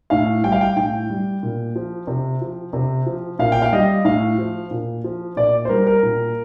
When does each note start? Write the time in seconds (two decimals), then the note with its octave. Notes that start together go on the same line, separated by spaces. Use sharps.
0.10 A2 F5
0.44 G3 G5
0.52 F5
0.61 G5
0.76 A2 G5
1.10 G3
1.43 A#2
1.75 F3
2.07 C3
2.41 F3
2.73 C3
3.06 F3
3.39 A#2 F5
3.52 G5
3.62 F5
3.73 G3 D#5
4.05 A2 F5
4.38 F3
4.71 A#2
5.04 F3
5.36 A#2 D5
5.65 C5
5.69 G3 A#4
5.87 A#4
6.03 A#2